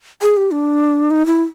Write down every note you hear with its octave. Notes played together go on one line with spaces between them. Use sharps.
G#4
G4
D4
D#4
E4